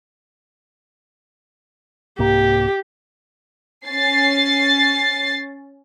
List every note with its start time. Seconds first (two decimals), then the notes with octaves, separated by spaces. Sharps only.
2.19 C2 G#2 A#3 G4
3.88 C#4 A6 C7